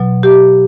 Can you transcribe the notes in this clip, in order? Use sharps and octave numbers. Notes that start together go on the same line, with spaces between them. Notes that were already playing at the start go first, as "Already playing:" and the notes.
Already playing: B2 F#3
G4